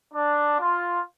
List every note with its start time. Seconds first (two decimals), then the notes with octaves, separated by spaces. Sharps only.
0.13 D4
0.59 F4